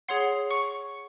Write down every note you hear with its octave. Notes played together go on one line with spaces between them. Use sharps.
G#4 C#5 F#5 C6 C7
C#6 C#7